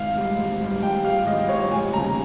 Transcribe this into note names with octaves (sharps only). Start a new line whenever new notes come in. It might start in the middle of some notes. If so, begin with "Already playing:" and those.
Already playing: G#1 F5
G#2 G3
G#1
G#2 G3
G#1 G5
G#2 G3 F5
G#1 D#5
G#2 G3 C#5
F1 G#5
D#2 C#3 G3 A#5